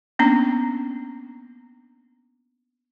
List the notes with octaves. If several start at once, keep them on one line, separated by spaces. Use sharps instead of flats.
A#3 B3 C#4 D4 A#5